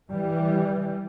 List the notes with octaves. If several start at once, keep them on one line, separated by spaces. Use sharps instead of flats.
E3 G3